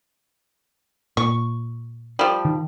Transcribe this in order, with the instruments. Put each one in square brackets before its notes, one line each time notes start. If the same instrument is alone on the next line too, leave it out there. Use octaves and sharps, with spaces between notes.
[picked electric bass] A#2 [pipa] C#6
[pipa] F3 G3
[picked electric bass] D#3